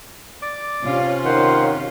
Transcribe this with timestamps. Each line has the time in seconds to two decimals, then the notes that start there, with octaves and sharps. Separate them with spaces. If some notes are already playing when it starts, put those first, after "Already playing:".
0.42 D5 D6
0.84 C3 C#4 F4
1.25 D#3 C5 F#5